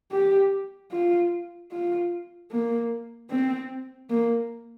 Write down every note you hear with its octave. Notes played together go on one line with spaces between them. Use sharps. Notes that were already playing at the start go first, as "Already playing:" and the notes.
G4
F4
F4
A#3
C4
A#3